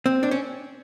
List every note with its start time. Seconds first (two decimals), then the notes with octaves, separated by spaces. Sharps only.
0.06 C4
0.23 D4
0.31 C#4